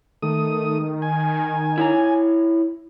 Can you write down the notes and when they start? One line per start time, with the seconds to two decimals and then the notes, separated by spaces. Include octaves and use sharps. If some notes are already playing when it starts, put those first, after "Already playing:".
0.22 D#3 A3 D#6
1.02 G#5
1.78 E4 C#5 A#5